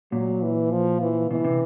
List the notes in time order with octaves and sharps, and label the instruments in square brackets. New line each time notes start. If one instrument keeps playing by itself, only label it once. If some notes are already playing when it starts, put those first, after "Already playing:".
[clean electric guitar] A#2 [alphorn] F#3
[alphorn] E3
F3
E3
[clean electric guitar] B2 [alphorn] E3
[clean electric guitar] C3